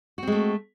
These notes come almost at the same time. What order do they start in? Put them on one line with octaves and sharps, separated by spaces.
F#4 C4 G#3 A3